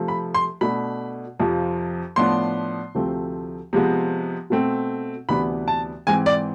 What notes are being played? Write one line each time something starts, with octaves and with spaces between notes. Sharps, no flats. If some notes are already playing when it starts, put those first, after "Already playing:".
Already playing: C3 F3 A3
B5
C6
B2 A3 D4 B5
F2 C3 F3
A2 F3 B3 D4 C6
D2 C3 F3 A3 C4
C3 F3 G#3 B3
B2 A3 C4
D2 C3 E3 B3 D4 B5
A5
G#2 E3 G#3 C4 G#5
D5